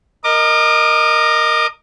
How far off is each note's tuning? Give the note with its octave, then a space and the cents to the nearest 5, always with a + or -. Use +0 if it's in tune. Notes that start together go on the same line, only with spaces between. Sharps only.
A#4 +0 D#5 +0 D6 +45